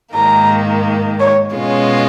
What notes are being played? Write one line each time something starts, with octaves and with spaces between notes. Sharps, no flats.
G#2 D#3 A#3 A#5
C#5
B2 G#3 C#4 F4